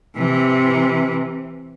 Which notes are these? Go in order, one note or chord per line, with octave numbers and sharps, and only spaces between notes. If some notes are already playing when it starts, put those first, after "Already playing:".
C3 E3